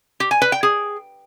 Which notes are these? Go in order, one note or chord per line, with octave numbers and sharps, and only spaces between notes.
G4
G#5
B4
G5
G#4